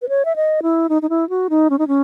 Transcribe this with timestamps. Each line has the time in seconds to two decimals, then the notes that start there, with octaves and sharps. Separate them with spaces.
0.02 B4
0.09 C#5
0.25 E5
0.36 D#5
0.63 E4
0.89 D#4
1.02 D#4
1.09 E4
1.30 F#4
1.50 D#4
1.70 C#4
1.79 D#4
1.88 C#4